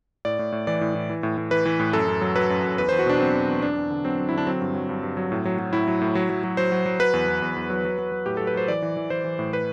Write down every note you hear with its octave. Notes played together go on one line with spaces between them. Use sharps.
A2 D5
A2
A2
E3 D5
A2
A2
E3
A2
A2
E3 B4
E3
A2
F#2 A4
F#2
F#3
F#3 B4
F#2
F#2
E2 B4
E2 C5
F#4
B2 D4
F#3 C4
E2
E2
E2 D4
E2
D3
F#3 C4
F#3
D3 E4
D4
F#3 C4
G2
F#3
G2
G2
F#3
A2
F#3
F#3
A2 E4
F#3
A2
F#3
F#3
F#3
F#3 C5
F#3
F#3
F#3 B4
E2
E2
E2
E2
F#3
F#3
F#3
F#3
A2 G4
F#3 A4
B4
F#3 C5
E3 D5
E3
E3
E3 C5
E3
A2
B4